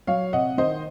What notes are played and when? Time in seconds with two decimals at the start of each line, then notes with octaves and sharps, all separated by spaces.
0.07 F#3 C#5 F5
0.33 C3 D#5 F#5
0.57 D#3 C5 D#5